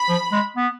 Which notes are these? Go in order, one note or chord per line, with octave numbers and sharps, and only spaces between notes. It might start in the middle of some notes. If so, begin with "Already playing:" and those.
Already playing: B5
F3
G#3
B3